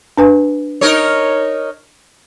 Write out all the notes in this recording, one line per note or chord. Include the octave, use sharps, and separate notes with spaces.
D4 B4 G#5
D#4 A#4 C#5